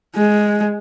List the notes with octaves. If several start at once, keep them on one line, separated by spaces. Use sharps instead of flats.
G#3